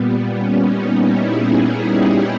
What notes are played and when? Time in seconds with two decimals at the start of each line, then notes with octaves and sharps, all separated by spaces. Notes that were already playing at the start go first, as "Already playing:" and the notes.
Already playing: A#2 G3 B3
0.32 C#4
0.63 D#4
0.95 E4
1.26 G#4
1.58 G#4
1.90 G4